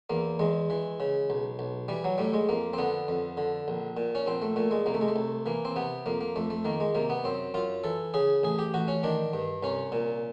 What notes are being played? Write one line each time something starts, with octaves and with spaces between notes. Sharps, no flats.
E2 A#3
E2 G#3
E3
C#3
B1
B1
E3 G3
F#3
A2 G3
G#3
F2 A#3
C4
D3 B3
F2
D3
A#1
A#2
C#4
A#1 C4
A3
A#2 A3
G#3
C2 A#3
A3
G#3
A3
C2
E3 A#3
C4
C3 B3
F2 A#3
A#3
F2 A3
A3
D#3 A#3
G#3
C3 A#3
B3
F#2 C4
F#2 F4
E3 A4
C#3 G#4
A1 G#4
G4
A1 F#4
C#4
D#3 D4
G2
C2 C#4
A#2